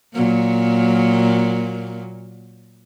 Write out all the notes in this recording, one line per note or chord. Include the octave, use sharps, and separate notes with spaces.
A#2 F#3 A#3